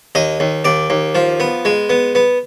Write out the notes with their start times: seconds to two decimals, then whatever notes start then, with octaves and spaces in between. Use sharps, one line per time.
0.15 D#2 D#5
0.40 D#2
0.64 D#2 D5
0.90 D#2
1.15 F3
1.40 B3
1.65 G#3
1.90 B3
2.15 B3